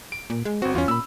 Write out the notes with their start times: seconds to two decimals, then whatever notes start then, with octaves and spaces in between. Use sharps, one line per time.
0.12 D7
0.30 A#2
0.45 G#3
0.62 G1 C4 F#4
0.75 E2 C#4 F4
0.88 A#2 B5 E6